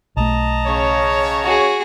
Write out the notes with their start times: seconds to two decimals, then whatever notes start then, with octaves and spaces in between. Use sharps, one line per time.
0.17 B1 A3 D#5 A5 A#5
0.65 C#3 C#5
1.43 F#4 G#4